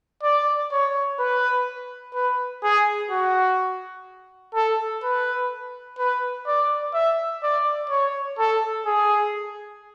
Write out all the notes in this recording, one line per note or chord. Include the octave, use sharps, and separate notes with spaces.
D5
C#5
B4
B4
G#4
F#4
A4
B4
B4
D5
E5
D5
C#5
A4
G#4